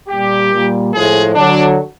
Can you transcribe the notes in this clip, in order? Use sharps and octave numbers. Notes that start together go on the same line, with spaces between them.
A#2 G3 G4
A#2 G3
A2 F3 G#3 G#4
D3 F#3 D4